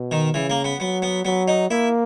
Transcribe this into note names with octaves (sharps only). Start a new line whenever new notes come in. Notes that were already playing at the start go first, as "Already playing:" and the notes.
Already playing: B2
D#3
C#3 E3
A#3
B3
F#3 B3
B3
F#3 B3
D#4
A#3 E4